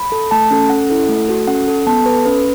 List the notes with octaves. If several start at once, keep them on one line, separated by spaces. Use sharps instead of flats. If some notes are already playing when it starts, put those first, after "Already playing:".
Already playing: B5
A4
A3 A5
C#4 A4
C#4 F#5
E4 A4
A3
F#4 A4
C#4 F#5
A4
B3 A5
A4 B4
C#4 B4